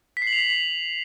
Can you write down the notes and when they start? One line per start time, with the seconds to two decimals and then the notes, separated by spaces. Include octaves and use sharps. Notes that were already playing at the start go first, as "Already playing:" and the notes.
0.17 B6
0.22 C7
0.27 F#7
0.33 F7